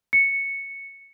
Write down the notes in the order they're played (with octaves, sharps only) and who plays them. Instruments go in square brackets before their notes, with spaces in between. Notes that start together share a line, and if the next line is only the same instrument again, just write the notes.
[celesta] C#7